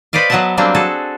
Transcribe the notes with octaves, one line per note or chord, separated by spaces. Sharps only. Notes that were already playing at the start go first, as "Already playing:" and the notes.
B4 C5 D5 D#5 F5
F#3 B3 D#5 E5 F#5 A5
F#3 G3 A#3 C4 D4
F#4 G#4 A4